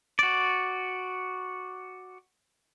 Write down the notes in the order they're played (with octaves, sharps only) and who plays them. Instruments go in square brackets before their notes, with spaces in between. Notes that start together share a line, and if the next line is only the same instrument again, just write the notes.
[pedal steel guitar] F#4 D5